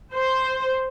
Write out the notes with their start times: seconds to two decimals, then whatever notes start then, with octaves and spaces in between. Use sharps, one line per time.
0.14 C5